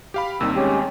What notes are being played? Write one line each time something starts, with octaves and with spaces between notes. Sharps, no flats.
G4 F5 B5
D#2 C3 D#3 G3 E6
G#3 C#4 G4